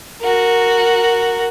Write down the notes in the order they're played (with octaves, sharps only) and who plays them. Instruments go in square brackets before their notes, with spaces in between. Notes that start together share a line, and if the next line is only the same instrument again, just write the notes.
[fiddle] F#4 A#4